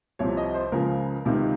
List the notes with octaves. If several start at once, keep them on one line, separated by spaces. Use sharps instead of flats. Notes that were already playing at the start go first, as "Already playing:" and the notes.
C2 C3 F3 C#5
D#5
C5
C#2 C#3 F3 A#4
C#2 C3 D#3